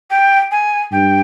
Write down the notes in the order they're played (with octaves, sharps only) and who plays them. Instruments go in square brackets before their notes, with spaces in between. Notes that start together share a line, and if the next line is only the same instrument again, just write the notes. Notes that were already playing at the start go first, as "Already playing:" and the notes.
[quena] G5
G#5
[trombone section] G2 [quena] G5